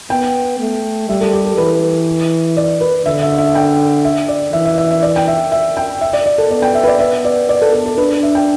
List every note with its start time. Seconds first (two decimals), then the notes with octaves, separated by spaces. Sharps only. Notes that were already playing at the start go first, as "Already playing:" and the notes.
0.10 B3 G5
0.60 A3
1.09 G3 E5
1.21 A4
1.33 G4
1.45 A4
1.57 E3 B4
2.57 D5
2.81 B4
3.05 D3 E5
3.23 E5
3.38 E5
3.55 G5
4.05 E5
4.29 D5
4.53 E3 E5
4.65 E5
4.78 E5
4.91 E5
5.02 D5
5.16 G5
5.28 E5
5.52 E5
5.77 G5
6.01 E5
6.13 D5
6.26 D5
6.38 A4
6.50 B3 D5
6.62 G5
6.75 E5
6.83 B4
6.88 D5
6.99 E5
7.25 D5
7.49 D5
7.62 A4
7.73 A4
7.86 A4
7.98 D4 B4
8.23 E5
8.35 G5